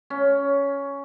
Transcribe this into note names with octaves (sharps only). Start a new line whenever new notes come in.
C#4